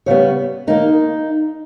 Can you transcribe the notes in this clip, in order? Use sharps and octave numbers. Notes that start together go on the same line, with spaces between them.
C#3 G3 B3 C#5
D#3 A#3 D#4